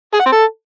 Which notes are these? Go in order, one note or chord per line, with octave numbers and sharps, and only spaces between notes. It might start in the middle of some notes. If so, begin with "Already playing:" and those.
G#4
F#5
C4
A4